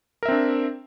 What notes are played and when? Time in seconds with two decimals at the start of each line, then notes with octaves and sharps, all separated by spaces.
0.23 A#4
0.26 E5
0.28 C4
0.31 D4